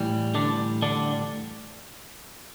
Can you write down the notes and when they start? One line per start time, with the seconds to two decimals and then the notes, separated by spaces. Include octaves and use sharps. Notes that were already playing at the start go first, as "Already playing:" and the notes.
Already playing: A2 E3 G3
0.35 D3 D4
0.82 D3 D4